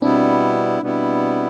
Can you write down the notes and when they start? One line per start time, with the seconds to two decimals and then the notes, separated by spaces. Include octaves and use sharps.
0.02 B2 G3 B3 C4 D4 E4
0.82 B2 G3 B3 E4